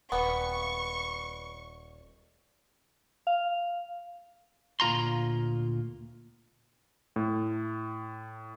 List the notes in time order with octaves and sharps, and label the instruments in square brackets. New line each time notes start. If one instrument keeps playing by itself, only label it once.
[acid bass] D#1 [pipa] G3 B3 [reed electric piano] F#5 [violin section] C#6
[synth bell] F5
[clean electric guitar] D2 A#2 F4 A#5 C6
[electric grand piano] A2